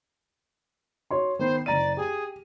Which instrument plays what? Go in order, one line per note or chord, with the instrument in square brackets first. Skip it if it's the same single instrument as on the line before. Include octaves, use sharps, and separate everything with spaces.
[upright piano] F#4 C#5 C6
[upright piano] D#3 B3 [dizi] C5
[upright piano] F#1 A#5 D#7 [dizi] D5
[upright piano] G4 [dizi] G#4